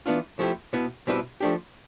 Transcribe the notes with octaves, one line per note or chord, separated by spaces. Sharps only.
E3 B3 D4 F4
F3 A3 C4 E4 G4
B2 B3 E4
B2 G3 C4 E4 B4
F3 A3 D4 G4